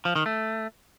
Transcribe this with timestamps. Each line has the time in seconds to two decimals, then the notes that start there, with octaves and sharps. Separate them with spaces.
0.05 F3
0.16 D#3
0.26 A3